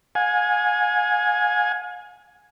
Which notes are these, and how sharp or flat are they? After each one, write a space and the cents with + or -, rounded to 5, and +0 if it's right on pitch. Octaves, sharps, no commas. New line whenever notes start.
F5 +45 G#5 +0